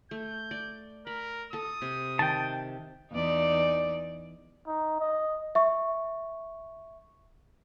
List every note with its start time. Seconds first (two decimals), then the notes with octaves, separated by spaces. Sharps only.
0.11 A3 G6
0.51 D5
1.07 A#4 B5
1.53 A4 A5 D#6
1.82 C3
2.19 D#3 G5 A5
3.12 E2 D#4 D5
4.67 D#4
5.00 D#5
5.55 E5 C#6